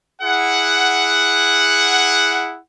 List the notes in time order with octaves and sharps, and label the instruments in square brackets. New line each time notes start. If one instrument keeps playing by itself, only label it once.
[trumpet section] E4 G#4 F#5